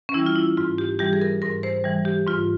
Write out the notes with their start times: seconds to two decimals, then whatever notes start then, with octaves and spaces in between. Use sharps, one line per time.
0.09 C#4
0.14 E3 G3 E4
0.26 F4
0.35 E4
0.57 G#2 F4
0.78 G4
0.99 E3 G3 G4
1.13 G#4
1.22 A#4
1.42 G#2 A#4
1.63 C5
1.84 E3 G3
2.05 G4
2.27 G#2 F4